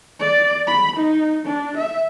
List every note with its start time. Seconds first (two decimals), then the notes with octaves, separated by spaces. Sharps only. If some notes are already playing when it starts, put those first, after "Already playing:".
0.20 D5
0.67 B5
0.96 D#4
1.46 D4
1.77 E5